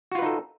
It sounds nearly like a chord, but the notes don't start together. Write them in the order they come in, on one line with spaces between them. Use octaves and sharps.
F#4 F4 B4 D#4 A4